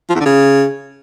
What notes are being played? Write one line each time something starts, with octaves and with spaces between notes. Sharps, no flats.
F3
E2
D3
C#3